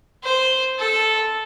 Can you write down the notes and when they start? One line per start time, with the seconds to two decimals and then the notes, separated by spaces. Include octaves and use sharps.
0.24 C5
0.79 A4